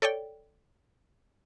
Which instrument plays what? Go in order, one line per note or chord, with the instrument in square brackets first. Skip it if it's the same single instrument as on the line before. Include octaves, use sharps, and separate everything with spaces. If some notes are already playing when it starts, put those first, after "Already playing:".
[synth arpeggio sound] A4 C#5 D5 G5